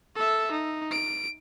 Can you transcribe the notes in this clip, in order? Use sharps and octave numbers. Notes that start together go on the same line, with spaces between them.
A4 E5
D#4
D7